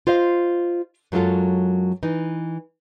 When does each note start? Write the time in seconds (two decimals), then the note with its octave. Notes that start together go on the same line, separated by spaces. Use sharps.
0.07 F4 C5 D#5 F5
1.12 F#2 F#3 G#3 F4 A4
2.03 E3 D#4